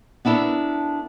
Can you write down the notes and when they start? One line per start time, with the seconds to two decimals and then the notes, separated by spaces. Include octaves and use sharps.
0.25 B3 D4 E4 A4 A#4